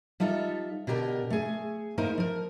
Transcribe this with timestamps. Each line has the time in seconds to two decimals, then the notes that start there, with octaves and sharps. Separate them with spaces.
0.20 G3 D#4 F4 A4 E5
0.87 B2 D3 G4 A#4
1.30 A3 G#4
1.98 A#3 D#4 E4 A#4 C5
2.18 F3 A#4